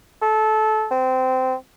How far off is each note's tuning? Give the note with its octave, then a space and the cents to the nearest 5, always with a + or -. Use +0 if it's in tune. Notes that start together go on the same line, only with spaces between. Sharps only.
A4 -20
C4 -20